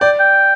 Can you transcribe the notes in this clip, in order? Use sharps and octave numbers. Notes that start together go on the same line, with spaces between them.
D5 G5
G5